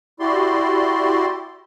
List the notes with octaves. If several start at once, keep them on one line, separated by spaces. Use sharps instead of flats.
E4 F#4 G4 D5 C6